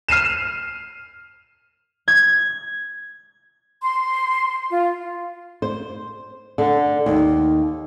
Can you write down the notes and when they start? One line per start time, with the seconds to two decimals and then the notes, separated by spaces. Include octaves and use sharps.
0.09 F6 C7 D#7 E7
2.08 G#6
3.83 C6
4.71 F4
5.62 C5
6.58 D3
7.06 D#2